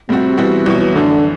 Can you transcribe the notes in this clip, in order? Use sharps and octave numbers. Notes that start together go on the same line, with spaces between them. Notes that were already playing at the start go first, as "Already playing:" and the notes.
A2 C3 G3 C4 F#4
B2 E3 G3 C4 F#4
C2 B2 E3 F#3
E3
F#2 D3 E3 A3